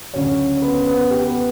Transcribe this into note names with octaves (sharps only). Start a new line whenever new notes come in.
D2 C#3 F#3 C#4 C#5
C#5
B3 B4
B3 B4
G4
B3 B4